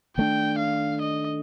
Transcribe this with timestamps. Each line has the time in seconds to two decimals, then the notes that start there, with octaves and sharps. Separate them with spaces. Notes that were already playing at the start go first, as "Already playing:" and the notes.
0.17 D#3 A3 D4 G5
0.59 F5
1.02 D#5